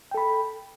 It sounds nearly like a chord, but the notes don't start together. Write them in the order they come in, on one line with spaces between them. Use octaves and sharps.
G5 A4 B5